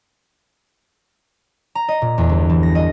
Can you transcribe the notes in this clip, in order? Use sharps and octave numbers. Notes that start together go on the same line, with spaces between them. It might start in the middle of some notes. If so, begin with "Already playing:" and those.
A#5
D#5
A#2
E2
G1
E3
A#6
D#5